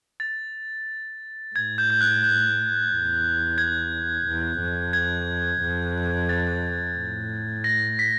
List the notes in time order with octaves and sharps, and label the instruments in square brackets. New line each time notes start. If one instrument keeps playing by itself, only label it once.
[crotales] A6
[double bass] A2 [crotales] G#6
[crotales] G6
G6
F#6
G6
[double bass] E2
[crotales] G#6
[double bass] E2
F2
[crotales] G#6
[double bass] F2
[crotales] A6
[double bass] A2
[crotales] A#6
B6